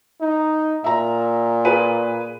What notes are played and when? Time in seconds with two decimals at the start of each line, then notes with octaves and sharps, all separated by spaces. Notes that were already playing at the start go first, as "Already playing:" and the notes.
0.21 D#4
0.84 A#2 E5 A#5
1.65 G#4 B4 D#7